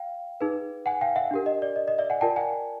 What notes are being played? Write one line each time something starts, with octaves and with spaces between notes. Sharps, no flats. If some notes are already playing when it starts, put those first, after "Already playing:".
Already playing: F5 G5
D#4 G#4 B4
F#5 G#5
F5 G5
E5 F#5
D4 G4 A#4
D#5
D5
D#5
D#5
D5 E5
F#5 G#5
F4 A#4 D5 G5 A5
F#5 G#5